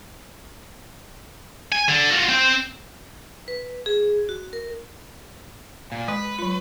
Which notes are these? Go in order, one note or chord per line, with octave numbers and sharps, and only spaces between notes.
G#5
D3
F4 F#4
C4 G5
B4
G#4
F#4
A#4
A#2
G#3 B4
F#3 F4